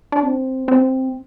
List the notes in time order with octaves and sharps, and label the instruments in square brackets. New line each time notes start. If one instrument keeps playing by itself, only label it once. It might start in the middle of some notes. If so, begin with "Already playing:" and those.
[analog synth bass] D4
C4
C4